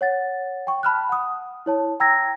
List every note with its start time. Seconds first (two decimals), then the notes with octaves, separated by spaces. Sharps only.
0.01 C#5 F#5 A6
0.67 G5 C#6
0.83 A5 B5 F6 F#6
1.09 F#5 D#6
1.66 E4 C#5 A5
2.00 G5 A#5 E6 G#6 A#6